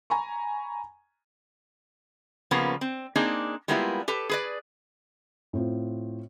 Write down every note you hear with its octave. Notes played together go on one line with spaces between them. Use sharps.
G#5 A#5 B5 C#6
C#3 F3 G3 A#3 B3 C#4
C4
A#3 C4 D4 D#4 G#4
G3 G#3 A#3 B3 E4 F4
G4 A4 B4
G#4 B4 D5
A2 C4 F4